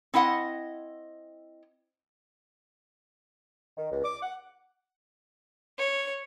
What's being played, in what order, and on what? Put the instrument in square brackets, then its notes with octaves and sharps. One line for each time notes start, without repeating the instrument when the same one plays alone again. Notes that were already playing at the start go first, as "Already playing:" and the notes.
[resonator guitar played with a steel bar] C4 E4 D#5 F#5
[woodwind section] D#3
C#2
D6
F#5
[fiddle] C#5